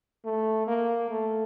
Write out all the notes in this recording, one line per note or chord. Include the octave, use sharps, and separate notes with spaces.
A3
A#3
A3